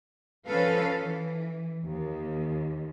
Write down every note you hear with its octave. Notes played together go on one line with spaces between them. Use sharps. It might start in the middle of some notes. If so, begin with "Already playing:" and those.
F3 C#4 A4 B4 F5
E3
D#2